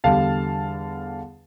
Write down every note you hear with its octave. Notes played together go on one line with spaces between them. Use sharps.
E2 D3 G3 F5 A5